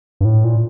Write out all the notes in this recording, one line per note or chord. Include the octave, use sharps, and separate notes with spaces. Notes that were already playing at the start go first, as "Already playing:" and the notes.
G2
A2
A#2